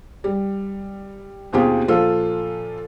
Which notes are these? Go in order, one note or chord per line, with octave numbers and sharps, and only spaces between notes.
G3
D#2 B2 C4 F4 G4 G#4
A#2 F3 F4 A4